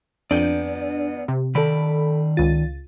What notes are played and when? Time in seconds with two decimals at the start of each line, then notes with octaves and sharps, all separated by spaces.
0.31 F2 B3 D4 D5 G6 D#7
1.28 C3
1.55 D#3 A4 D5 B5
2.37 C#2 F4 A6 D#7